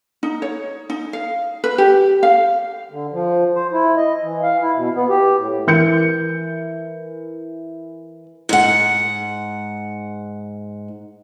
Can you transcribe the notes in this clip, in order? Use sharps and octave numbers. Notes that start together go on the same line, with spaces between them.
D#4
C#5
D#4
F5
B4
G4
F5
D3
F3
C5
E4
D#5
E3
F5
E4
B2
B3
G4
A2
E3 A#4 G6 C#7
G#2 F#5